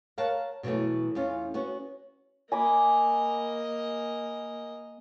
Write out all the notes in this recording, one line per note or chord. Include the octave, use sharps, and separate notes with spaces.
A#4 C#5 F5 F#5 A5
B2 E3 F#3 A3 B3
E2 A3 C#4 F4
B3 C#4 F#4
A#3 D#5 G#5 B5 D6